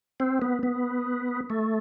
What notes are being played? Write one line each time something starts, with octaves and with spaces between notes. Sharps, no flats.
C4
B3
B3
A3